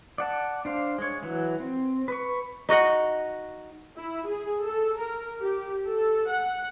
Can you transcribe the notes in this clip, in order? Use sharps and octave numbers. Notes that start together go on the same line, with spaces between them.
D5 F#5 A5
D4 C5 F5
G#3 C#5
E3 F#3
C4
B4 C#6
D#4 F#4 D#5 F#5
E4
G#4
A4
A#4
G4
A4
F#5